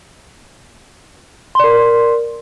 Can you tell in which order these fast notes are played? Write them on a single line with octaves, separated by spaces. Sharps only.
C6 D5 A#4